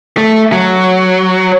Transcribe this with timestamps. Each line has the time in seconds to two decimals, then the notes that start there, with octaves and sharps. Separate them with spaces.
0.18 A3
0.52 F#3